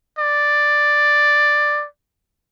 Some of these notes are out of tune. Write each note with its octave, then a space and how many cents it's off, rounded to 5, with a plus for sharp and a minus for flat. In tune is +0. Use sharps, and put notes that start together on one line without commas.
D5 +5